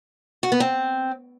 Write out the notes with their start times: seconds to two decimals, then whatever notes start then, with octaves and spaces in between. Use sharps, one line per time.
0.43 F#4
0.52 B3
0.60 C4